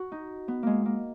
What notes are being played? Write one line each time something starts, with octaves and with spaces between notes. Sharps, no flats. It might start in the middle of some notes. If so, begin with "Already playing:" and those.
Already playing: F#4
D#4
B3
G#3 A#3
A#3